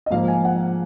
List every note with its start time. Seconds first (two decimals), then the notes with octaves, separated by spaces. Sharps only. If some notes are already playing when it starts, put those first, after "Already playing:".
0.06 D#5
0.11 G#2 F3 A#3 F5
0.28 G#5
0.45 F#5